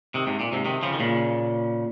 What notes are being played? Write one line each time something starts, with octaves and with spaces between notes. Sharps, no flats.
C3 D#3
G#2 C3
A#2
G#2 C3
C3 D#3
C#3 F3
D#3
A#2 C#3